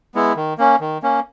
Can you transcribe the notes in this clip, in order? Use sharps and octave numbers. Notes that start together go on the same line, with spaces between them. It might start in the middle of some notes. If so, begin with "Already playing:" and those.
G#3 B3 E4
D#3
A#3 C#4
D#3
A#3 C#4